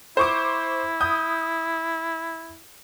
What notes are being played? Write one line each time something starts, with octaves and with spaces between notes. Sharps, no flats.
E4 C5 C#6 D6
D#6 G6